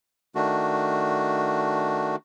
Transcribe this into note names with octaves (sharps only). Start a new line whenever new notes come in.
D#3 A3 D4 F#4